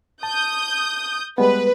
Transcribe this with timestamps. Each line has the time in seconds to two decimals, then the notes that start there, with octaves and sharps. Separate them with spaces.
0.23 A5 D#6 G6
1.38 G3 G#3 B3 B4